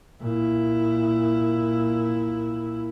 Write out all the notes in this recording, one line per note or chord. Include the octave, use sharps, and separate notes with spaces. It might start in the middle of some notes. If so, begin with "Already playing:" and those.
A#2 E4